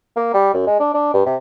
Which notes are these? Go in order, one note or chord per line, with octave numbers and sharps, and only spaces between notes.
A#3
G3
F#2
G#3
D4
D4
G2
C3